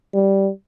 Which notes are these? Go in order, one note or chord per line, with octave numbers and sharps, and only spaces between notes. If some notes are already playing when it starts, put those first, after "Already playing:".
G3